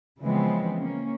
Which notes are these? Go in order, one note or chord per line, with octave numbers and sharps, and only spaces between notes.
C#3 E3 F3 G#3 B3 C4
A#3 C#4